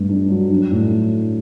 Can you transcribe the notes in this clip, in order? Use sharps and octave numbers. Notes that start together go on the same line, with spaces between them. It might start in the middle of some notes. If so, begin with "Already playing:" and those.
Already playing: G2 A3
D4
F#3
D4
A2